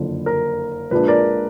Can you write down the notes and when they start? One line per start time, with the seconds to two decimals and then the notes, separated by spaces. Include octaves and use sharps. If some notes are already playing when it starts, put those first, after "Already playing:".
Already playing: F#1 F2 D3
0.26 A#4
0.91 A#1 A#2 G#3 D4 B4
1.08 A#4 D5